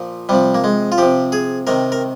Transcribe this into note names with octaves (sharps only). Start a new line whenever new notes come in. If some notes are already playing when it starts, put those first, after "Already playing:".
Already playing: A#2 F3
C3 F3 G3
A#3
G#3
F4
C3 F3 G4
G#4
C3 D#3 A#4
A#4